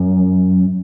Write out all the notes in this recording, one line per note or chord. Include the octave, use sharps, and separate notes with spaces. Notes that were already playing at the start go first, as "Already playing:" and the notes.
Already playing: F#2